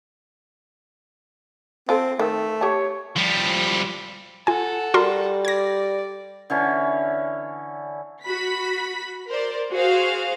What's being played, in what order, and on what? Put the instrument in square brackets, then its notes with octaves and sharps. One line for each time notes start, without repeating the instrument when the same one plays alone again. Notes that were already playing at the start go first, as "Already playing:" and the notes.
[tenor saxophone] C4 [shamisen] F4 A4
[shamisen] D#3 [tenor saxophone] A3
[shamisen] G4 A5 [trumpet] C#5
[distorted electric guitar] F3 G3
[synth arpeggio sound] F4 G#5 [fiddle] A4 F#5
[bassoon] G3 [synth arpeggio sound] F#4 A#4 C6
[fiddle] D5 [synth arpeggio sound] G#6 A#6
[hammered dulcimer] D3 E3 C#4
[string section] F#4 B5 B6
A#4 C5 D5
F#4 G#4 C5 F5